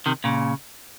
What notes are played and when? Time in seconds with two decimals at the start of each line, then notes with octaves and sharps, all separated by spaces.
0.06 C3 D#3
0.24 A#2 C#3